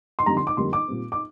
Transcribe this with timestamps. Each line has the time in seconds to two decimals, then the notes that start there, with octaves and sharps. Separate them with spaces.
0.19 C6
0.26 F2 D3 G3 A#3 A#5
0.37 C6
0.47 D6
0.57 F2 D3 G3 A#3 C6
0.73 D6
0.88 A#2 G3 C4
1.12 D6